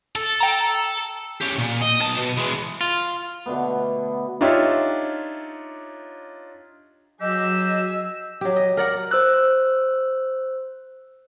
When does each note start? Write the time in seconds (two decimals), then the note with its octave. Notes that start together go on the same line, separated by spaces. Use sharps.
0.15 A4
0.40 G5 A#5
1.41 C#4 G4
1.58 A#2
1.81 D#5
2.00 B1 A5
2.18 B2
2.37 E3 G#3
2.81 F4
3.46 B2 D3 A3 B3
4.41 D4 D#4 F4 G4 C#5 E5
7.20 F#3 G4 G#4 D#5 E6
8.41 F#3 G4
8.56 D#5
8.77 A#4 D5 F#5
9.11 C5 E6 F#6